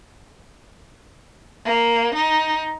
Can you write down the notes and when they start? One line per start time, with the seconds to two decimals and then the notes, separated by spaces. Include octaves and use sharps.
1.65 A#3
2.15 D#4